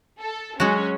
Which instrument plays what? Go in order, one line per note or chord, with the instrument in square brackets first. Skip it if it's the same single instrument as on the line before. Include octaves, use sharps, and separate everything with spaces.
[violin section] A4
[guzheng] F#3 [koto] G#3 F#4 [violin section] C#4